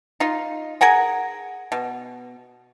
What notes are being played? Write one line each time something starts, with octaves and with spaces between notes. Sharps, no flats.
D#4 F4
G#4 A#4 F#5 G#5
B2